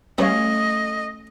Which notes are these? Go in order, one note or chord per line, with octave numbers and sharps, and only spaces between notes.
G3 A3 B3 C#4 C#5 D#5 F5